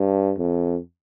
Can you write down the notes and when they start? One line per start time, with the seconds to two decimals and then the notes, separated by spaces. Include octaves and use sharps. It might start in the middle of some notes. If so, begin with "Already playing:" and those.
Already playing: G2
0.38 F2